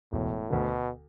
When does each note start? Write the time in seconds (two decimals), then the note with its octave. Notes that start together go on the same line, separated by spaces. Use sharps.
0.12 E1 A2
0.50 D2 B2 D3